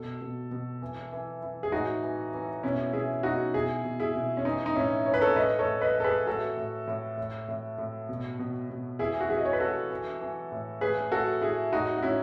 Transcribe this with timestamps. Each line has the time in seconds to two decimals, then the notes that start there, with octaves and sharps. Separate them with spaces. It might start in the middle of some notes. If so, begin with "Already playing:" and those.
Already playing: B2 A4
0.21 B2
0.51 B2
0.82 E3
1.12 E3
1.42 E3
1.63 G#4
1.72 A2 D#4 F#4
2.03 E3
2.33 E3
2.63 B2 C#4 E4
2.93 B2 E4 G#4
3.23 B2 D#4 F#4
3.54 B2 E4 G#4
3.85 B2
4.00 E4 G#4
4.15 B2
4.37 C#4
4.45 E3 D#4
4.66 D#4
4.76 A2 C#4 E4
5.06 E3 C#5
5.14 B4
5.22 A4 C#5
5.36 A2 B4 D#5
5.59 A4 C#5
5.66 A2
5.81 B4 D#5
5.97 E3 A4
6.04 G#4 B4
6.27 A2 F#4 A4
6.57 A2
6.87 A2
7.17 A2
7.48 A2
7.78 A2
8.09 B2
8.39 B2
8.70 B2
8.99 E3 E4 G#4
9.21 F#4
9.30 E3 E4 G#4
9.38 D#5
9.45 C#5
9.53 B4
9.60 E3 F#4 A4
9.90 E3
10.21 E3
10.52 A2
10.81 A2 G#4 B4
11.12 A2 F#4 A4
11.42 A2 E4 G#4
11.72 A2 D#4 F#4
11.98 F#4
12.03 A2 C#4 E4